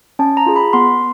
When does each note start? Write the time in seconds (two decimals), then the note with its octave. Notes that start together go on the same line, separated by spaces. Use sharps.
0.19 C#4 A5
0.37 A#5
0.46 F4 G#4
0.56 B5
0.73 B3 C6